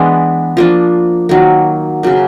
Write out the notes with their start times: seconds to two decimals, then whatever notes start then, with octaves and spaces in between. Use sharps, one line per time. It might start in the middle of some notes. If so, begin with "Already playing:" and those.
Already playing: E3 G#3 B3 D4
0.57 F3 A#3 D4
1.29 D#3 F#3 A#3
2.03 C#3 F#3 A#3